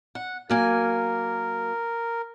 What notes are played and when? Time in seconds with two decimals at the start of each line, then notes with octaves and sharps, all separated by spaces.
0.15 F#5
0.50 F#3 A#3 A#4 G#5